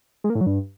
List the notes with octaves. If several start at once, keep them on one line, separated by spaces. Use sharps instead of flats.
G#3
A#3
A2
F#3
G2